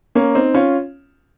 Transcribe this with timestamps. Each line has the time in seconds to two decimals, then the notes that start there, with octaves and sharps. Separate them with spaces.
0.15 A#3 C#4
0.35 C4 D#4
0.54 C#4 F4